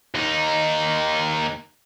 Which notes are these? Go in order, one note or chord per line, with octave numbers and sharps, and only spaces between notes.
D#2 D#4